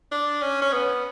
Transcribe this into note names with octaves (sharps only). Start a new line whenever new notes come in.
D4
C#4
C#4
B3